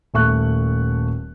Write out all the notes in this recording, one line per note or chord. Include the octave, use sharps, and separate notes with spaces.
D#1 A3 C#6 F#6